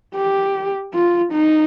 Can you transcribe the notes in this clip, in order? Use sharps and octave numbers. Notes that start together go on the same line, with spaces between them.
G4
F4
D#4